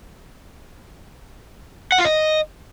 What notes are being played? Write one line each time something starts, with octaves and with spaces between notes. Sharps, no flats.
F#5
F4
D#5